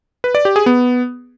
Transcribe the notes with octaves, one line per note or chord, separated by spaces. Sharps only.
B4
D5
G4
G#4
B3